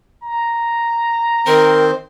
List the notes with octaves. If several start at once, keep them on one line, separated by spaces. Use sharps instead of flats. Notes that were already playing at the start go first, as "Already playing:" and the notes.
A#5
D#3 C4 A#4 C5